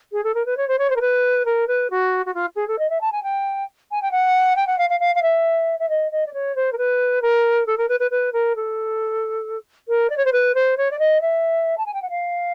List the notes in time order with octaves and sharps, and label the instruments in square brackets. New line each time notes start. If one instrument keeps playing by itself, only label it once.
[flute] G#4
A4
A#4
B4
C#5
C5
C#5
C5
A#4
B4
A#4
B4
F#4
F#4
F4
G#4
A4
D#5
E5
A5
G#5
G5
G#5
G5
F#5
G5
F#5
F5
F5
F5
F5
E5
E5
D#5
D#5
D5
C#5
C5
A#4
B4
A#4
A4
A#4
B4
B4
B4
A#4
A4
A#4
D5
C#5
C5
B4
C5
C#5
D5
D#5
E5
A5
G#5
G5
F#5
F5